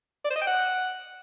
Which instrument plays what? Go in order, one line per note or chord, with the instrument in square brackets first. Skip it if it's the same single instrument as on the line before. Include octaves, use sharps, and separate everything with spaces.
[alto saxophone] D5
C5
D#5
G5
F#5